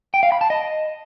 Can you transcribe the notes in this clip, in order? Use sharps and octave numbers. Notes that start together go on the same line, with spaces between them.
G5
F5
B5
A5
D#5